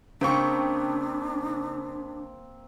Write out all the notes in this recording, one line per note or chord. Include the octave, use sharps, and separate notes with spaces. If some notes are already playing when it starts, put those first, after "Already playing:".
C#3 A#3 C4 D4 G5 C#6